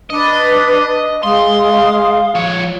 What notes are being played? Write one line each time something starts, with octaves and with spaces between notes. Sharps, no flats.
D4 B4 D#5
G#3 F5 C6 D#6
F3 C#5